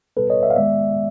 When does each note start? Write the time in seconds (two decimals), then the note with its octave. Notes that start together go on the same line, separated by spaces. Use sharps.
0.17 B2 G3 B3 A4 B4
0.30 C#5 D#5
0.43 D5 E5
0.50 F5
0.56 D#3 G#3 B3 D5 E5